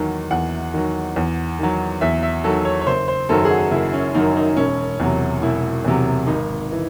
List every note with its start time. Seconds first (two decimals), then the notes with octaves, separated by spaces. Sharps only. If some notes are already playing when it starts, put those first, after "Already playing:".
Already playing: E2 D#3 F#3
0.31 E2 F#5
0.74 D#3 F#3
1.16 E2
1.59 D#3 F#3
2.01 E2 E5
2.23 E5
2.44 D#3 F#3 A4
2.65 C#5
2.81 C#5
2.87 F#1 C5
3.08 C5
3.29 F#2 D#3 F#3 A4
3.45 G#4
3.51 F#4
3.71 F#1 E4
3.93 C#4
4.14 F#2 D#3 F#3 D#4
4.37 D#4
4.57 E1 C#4
5.00 E2 C3 F#3
5.42 E1 E4
5.85 E2 C3 F#3
6.27 G#1 D#4
6.72 E3